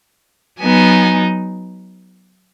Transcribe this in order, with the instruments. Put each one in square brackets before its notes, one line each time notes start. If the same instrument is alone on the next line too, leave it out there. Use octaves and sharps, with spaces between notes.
[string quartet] F#3 B3 D#4 G#5